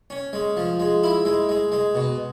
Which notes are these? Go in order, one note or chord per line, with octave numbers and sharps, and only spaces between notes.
C#4
G#3
F3
G#3
E4
G#3
G#3
G#3
B2